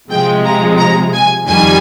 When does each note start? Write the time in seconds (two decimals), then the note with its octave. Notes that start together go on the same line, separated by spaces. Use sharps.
0.10 C3 F3 G#3 G5
0.45 A#5
0.78 A#5
1.13 G#5
1.47 F2 D#3 G3 G#5